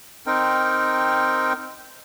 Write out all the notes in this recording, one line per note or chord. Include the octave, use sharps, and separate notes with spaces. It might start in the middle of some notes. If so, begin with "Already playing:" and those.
C4 D#4 A#4 G5